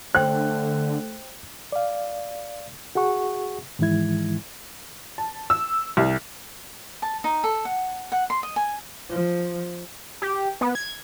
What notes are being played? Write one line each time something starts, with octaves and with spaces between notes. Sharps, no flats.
D3 A3 C5 G5 F#6
D5 F5
F#4 G#4 F#5 C#6
G#2 D#3 E3 G#3 E4 G#6
A5
E6
C2
A5
D#4
A4
F#5
F#5
C6
D#5
G#5
F3
G4
B3
G#6